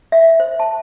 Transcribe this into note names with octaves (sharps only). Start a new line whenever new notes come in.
E5
C5
A5